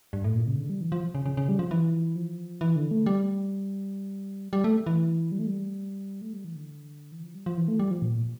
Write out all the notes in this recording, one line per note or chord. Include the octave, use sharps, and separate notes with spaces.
G2
A2
A#2
C#3
D3
G3
E3
F3
C#3
C#3
C#3
G3
F3
E3
F3
E3
D3
A3
G3
G3
A3
E3
G3
A3
G3
A3
G3
E3
D3
E3
F3
G3
F3
E3
A3
G3
F3
A#2